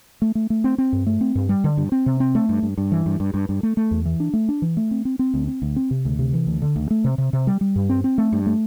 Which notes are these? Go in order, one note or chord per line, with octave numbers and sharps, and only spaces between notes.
A3
A3
A3
C4
C4
G2
A3
C4
G2
G3
D3
G2
C4
C3
C4
A3
G2
G2
G2
E3
G2
G2
G2
G2
A3
A3
E2
E3
D4
A3
D4
E3
A3
C4
C4
C4
D2
C4
D2
C4
C3
D2
C3
E3
D2
D3
D2
A3
C3
C3
C3
G3
G3
G2
C4
C4
A3
G2
A3